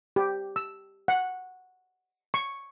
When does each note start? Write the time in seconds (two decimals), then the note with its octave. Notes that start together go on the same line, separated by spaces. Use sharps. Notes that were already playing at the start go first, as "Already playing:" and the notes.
0.16 G4
0.56 E6
1.08 F#5
2.34 C#6